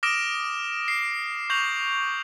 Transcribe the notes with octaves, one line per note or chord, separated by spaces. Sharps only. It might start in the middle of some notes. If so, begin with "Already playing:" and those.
D6 D#6 F6 A#6 D7 E7
C7
C#6 G6 A#6 F7 F#7